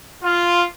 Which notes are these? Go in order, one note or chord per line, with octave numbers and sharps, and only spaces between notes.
F4